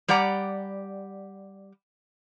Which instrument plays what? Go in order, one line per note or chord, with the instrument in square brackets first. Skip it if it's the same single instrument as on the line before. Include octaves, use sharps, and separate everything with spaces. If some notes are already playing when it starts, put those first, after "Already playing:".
[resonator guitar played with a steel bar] G3 G4 D5 F#5 A#5